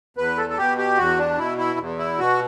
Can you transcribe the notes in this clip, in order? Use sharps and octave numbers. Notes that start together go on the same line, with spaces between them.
E2 B4
A4
A4
B2 G4
G4
E2 F#4
D4
B2 E4
E4
E2
E4
B2 F#4